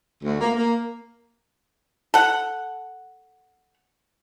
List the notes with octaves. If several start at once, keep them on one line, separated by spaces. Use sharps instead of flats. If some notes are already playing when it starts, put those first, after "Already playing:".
D2
A#3
A#3
A4 F#5